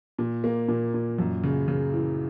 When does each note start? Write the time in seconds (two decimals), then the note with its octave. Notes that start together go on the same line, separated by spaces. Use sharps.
0.18 A#2
0.44 A#3
0.68 A#2
0.94 A#2
1.18 F#2
1.43 C#3
1.68 C#3
1.93 E3